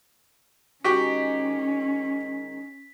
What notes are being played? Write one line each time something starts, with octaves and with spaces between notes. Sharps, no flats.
D#3 G#3 C#4 D#4 F#4 G4 B6